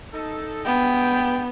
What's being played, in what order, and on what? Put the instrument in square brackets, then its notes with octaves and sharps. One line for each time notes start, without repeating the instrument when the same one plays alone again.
[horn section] D#4 A4
[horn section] G2 G#3 G5 [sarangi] B3